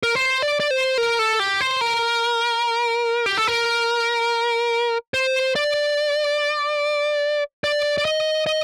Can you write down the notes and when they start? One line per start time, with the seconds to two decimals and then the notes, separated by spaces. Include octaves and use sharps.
0.03 A#4
0.15 C5
0.42 D5
0.60 D5
0.70 C5
0.98 A#4
1.19 A4
1.40 G4
1.61 C5
1.81 A#4
3.26 G4
3.37 A4
3.47 A#4
5.14 C5
5.56 D5
7.64 D5
7.98 D5
8.05 D#5
8.46 D#5